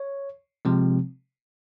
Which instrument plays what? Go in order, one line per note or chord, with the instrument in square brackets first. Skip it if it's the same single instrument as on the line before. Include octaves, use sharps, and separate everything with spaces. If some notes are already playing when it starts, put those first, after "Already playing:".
Already playing: [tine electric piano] C#5
C3 F3 G#3 C4